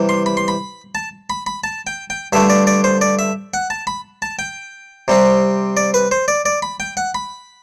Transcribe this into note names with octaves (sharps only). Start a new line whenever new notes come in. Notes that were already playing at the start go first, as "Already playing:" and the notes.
Already playing: C3 E3 G3
C6
B5
C6
B5
A5
B5
B5
A5
G5
G5
G2 D3 A3 E5
D5
D5
C5
D5
E5
F#5
A5
B5
A5
G5
C3 G3 C4
D5
B4
C5
D5
D5
B5
G5
F#5
B5